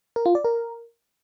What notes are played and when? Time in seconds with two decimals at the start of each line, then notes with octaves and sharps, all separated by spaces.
0.16 A#4
0.26 F4
0.35 D5
0.45 A#4